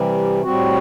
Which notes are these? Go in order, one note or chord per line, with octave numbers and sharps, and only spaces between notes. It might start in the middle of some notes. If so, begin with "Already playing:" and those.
Already playing: C3 E3 G3
A2 G3 C4 F#4